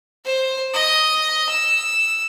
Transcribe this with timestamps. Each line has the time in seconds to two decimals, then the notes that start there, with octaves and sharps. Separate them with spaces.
0.24 C5
0.74 D#5
1.49 E6